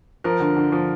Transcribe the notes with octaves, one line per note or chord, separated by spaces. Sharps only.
F3 A#4
D3
D3
F3